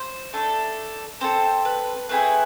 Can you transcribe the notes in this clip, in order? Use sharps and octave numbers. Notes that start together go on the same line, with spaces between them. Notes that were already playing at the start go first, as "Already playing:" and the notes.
Already playing: C5
A3 D4 A4
C4 E4 A4 C5
B4
A3 C4 E4 G#4 B4